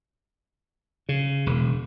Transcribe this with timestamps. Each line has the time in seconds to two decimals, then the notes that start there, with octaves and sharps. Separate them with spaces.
1.09 C#3
1.46 E1